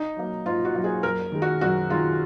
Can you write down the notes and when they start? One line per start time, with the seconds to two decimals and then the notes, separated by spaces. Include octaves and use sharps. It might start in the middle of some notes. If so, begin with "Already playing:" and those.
Already playing: D#4
0.17 F#3 A#3
0.45 G#2 F4
0.65 F#4
0.75 F#3 A#3
0.84 G#4
1.03 F#2 A#4
1.32 D#3 G#3
1.42 F#4
1.61 F#2 F#4
1.90 D#3 G#3 F4